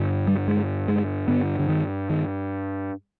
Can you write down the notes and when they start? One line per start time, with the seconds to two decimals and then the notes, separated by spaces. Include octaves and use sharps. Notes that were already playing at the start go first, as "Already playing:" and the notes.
Already playing: G2 D3
0.27 G3
0.48 G#3
0.88 G#3
1.28 G2 D3 B3
1.59 D3
1.69 D#3
2.10 D#3